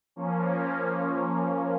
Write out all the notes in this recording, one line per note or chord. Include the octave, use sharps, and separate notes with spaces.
F3 A#3 C#4